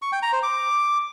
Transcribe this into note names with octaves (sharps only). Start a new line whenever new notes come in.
C#6
G5
A#5
C5
D6